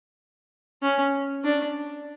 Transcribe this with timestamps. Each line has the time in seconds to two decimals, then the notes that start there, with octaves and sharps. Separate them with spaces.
0.82 C#4
1.44 D4